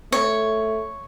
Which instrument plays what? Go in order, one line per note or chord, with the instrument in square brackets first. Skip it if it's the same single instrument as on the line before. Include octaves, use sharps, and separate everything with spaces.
[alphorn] A3 [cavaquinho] C#5